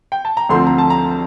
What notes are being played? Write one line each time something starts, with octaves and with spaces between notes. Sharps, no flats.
G5
A5
A#5
D2 D3 F3 A3 C4 C6
A#5
A5
A#5